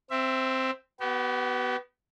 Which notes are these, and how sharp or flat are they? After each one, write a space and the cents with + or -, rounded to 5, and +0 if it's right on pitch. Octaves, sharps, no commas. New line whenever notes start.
C4 +0 E5 +15
B3 +0 G4 -45